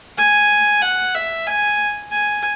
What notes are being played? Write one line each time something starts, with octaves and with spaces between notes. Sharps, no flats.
G#5
F#5
E5
G#5
G#5